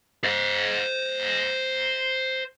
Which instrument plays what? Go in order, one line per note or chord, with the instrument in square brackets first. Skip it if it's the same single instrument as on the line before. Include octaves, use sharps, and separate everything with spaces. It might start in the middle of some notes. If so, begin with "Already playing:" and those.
[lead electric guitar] C5 D#5